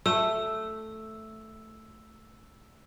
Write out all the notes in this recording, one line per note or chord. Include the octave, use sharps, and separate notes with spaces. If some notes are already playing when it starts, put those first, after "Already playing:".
A3 E6